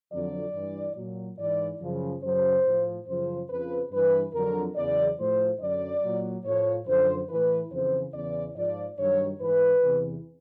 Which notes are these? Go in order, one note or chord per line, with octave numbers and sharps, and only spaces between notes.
F2 D3 F#3 D5
G2 E3
A#2 F#3
G#2 E3 D5
F#2 C#3 F3
F#2 C#3 F#3 C5
A2 F3
F#2 C#3 F3 C5
F2 C#3 F3 B4
G2 E3 B4
F2 D3 F#3 A#4
E2 C#3 F#3 D5
A2 F3 C5
F#2 D3 F#3 D5
A#2 F#3
A2 F3 C#5
F#2 D3 F3 C5
A2 E3 B4
F2 C#3 E3 C5
E2 C#3 E3 D5
G#2 F3 D5
G2 D#3 F#3 C#5
G#2 E3 B4
E2 C3 E3